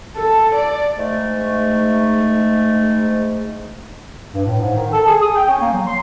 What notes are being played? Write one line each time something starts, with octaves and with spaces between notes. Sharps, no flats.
A4
D5
G#2 A3
G2
A2
G#2
D#3
A4
G#4
D#6
G5
C#4
A#3
F#3
C6